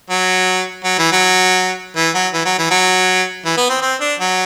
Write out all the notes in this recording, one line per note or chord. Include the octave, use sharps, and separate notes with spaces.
F#3
F#3
E3
F#3
E3
F#3
E3
F#3
E3
F#3
E3
B3
C4
C4
D4
F#3